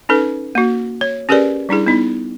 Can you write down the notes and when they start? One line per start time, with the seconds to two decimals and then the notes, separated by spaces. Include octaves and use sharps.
0.09 C#4 D#4 A4 B4
0.55 A#3 F#4
1.01 C#5
1.29 C#4 G4 G#4 A#4 B4 D5
1.69 G3 D4 E4 G#4
1.86 B3 D#4 E4